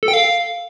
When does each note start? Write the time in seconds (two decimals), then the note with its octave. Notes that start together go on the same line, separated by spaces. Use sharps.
0.03 A4
0.08 G5
0.13 F5